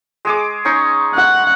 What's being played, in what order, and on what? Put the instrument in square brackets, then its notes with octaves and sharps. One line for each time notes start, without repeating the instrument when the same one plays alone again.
[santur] G#3 G#4 D6
C#4 D#4 C#6
[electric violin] F#5